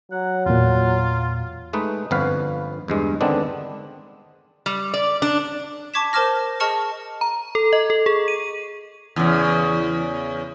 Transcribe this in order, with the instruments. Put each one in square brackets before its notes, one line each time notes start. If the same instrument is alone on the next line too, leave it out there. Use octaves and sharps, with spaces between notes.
[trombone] F#3 [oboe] F#5
[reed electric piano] E2 A#2 [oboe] F4
[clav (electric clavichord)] G#3 A3 D#4 B4
G1 F2 F3 B3 B4 F5
E2 G2 G#3
D3 D#3 G#3 B3 C4 D4
[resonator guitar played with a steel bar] G3
D5
D4
[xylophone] A5 C#6 D6 G#6 B6 E7
A#4 C5 A5 D6 F6 A#6
G#4 D#5 A5 C#6 F6 C#7
[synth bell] A#5
A4
D#5
A4
G#4
D#7
[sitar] E2 C#3